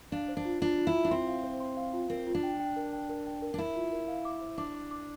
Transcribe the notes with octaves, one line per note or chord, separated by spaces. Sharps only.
D4 F5
C5
D4
F4
D4 F4
F4
E4
F4
D4
C4 C6
F5
C5
C6
F5
F4
C4 A#4
F4
D4
G5
G5
A#4
G5
A#4
G5
A#4
D4
E4 A#4
F4
A#4
F5
D6
C5
D4 D6
D6
D6